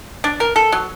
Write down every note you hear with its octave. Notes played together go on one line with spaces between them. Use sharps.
D4
A#4
A4
F#3